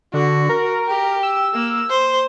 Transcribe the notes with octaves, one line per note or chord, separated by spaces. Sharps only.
D3 F#4
A#4
G4
E6
A#3
C5